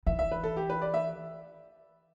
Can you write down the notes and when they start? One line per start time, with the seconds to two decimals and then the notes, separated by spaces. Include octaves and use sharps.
0.07 E3 E5
0.19 E5
0.31 B4
0.43 A4
0.57 G4
0.70 B4
0.82 D5
0.94 E5